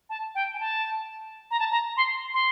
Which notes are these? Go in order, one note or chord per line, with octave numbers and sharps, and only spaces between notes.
A5
G5
G#5
A5
A#5
A5
A#5
C6
C6